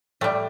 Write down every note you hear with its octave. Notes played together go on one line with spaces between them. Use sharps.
A2 G3 A3